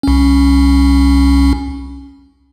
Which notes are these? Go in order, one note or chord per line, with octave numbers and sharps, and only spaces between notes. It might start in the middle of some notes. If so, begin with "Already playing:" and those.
C2 C#4